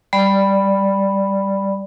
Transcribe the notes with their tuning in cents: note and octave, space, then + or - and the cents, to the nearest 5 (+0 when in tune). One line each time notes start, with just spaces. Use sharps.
G3 +0 D5 +0 B5 +0